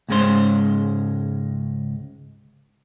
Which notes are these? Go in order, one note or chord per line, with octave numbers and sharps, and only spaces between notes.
C#2 G#2 G#3 C#4 C5